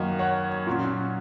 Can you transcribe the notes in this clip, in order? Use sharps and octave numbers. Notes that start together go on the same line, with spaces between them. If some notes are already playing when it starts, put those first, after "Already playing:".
Already playing: F#2 D#3 A#3 D#5
C#5 F#5
A#2 F#3 C#4